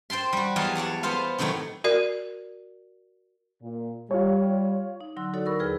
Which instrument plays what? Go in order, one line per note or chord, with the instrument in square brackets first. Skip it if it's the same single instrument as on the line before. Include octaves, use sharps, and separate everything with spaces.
[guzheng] C5 G5 A5 C6
G3 F#4
E2 F#3 D#5 F5 A5
C#5 D5 F#5 A5
B3 F4 C5 F5
A2 C3 D#3 F#3 A3
[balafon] F#4 A#4 D5
[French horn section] A#2
[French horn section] G3 [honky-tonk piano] F4 C#5
[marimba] D#4
D3 F#3 C6 E6 F#6
D#4 E4 F#4 A4 C#5 D5
A#4 B5 C#6 E6 A6
D#2 E4 G#4 B4 F6